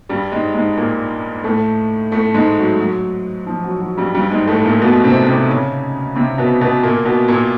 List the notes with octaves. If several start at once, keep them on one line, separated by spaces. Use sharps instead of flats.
G2 G3
G#2 G#3
G#2 G#3
A#2 A#3
A2 A3
A2 A3
G#2 G#3
F#3
F#3
F3
F#3
F#3
G2 G3
G2 G3
G#2 G#3
A2 A3
A#2 A#3
B2 B3
C3 C4
C3 C4
C#3 C#4
C3 C4
B2 B3
B2 B3
A#2 A#3
B2 B3
A#2 A#3